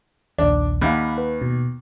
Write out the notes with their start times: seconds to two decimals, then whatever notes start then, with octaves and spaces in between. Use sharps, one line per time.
0.38 A#1 D#2 D4
0.81 D#2 F5 F#5 B5
1.18 B4
1.42 B2